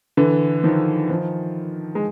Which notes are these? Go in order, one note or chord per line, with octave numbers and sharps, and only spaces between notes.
D3 E3
D#3 F3
D#3 F3
G#3